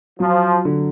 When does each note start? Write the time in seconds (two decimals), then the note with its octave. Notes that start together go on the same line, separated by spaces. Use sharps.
0.19 F3 F#3
0.65 D3